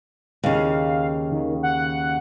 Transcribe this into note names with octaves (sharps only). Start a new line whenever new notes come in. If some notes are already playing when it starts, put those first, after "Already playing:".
D#2 C#3 F5
D#3
F#5